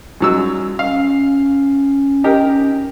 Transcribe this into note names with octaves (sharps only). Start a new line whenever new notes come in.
F#2 F#3 G3 E6
C#4 F5
D#4 G4 A#4